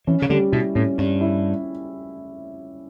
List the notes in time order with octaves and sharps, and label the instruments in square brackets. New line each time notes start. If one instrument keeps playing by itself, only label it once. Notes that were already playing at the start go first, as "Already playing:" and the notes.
[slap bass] E3 [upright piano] C#4
[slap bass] C#3
[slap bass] D3 [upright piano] G3
[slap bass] B2 [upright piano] E4
[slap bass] A2 [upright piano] C#4
[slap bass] G2 [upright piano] C#4
[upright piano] E4